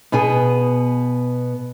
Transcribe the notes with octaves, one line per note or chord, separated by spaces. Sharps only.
B2 B3 G#4 G#5